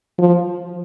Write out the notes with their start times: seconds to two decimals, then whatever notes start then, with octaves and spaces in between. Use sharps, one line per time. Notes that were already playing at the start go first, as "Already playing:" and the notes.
0.18 F3